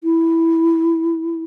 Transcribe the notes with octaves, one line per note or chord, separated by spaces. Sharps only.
E4